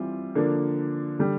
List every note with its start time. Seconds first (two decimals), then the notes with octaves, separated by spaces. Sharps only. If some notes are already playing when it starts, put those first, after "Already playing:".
Already playing: E3 G3 C4 F4
0.35 D3 F3 A#3 D4
1.19 D3 G3